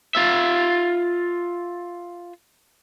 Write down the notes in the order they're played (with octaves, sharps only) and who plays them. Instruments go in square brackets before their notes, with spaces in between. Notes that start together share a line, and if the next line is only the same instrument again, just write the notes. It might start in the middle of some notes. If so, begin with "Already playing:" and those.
[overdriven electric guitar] F4 E5